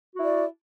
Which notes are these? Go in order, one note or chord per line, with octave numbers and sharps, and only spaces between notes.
E4 F#4 D5